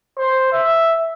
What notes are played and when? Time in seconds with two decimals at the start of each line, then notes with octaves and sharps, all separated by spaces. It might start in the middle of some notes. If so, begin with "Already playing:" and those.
0.18 C5
0.52 E5